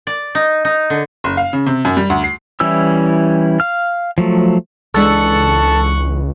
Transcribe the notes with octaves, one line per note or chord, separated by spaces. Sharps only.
D5
D#4
D#4
D3
F#1
F5
C#3
C3
F#2
G3
D2
C7
E3 G3 C#4 E4 E6
F5 F6
F3 F#3 A3
C#2 E3 G#3 D4 A4 F#5 C#6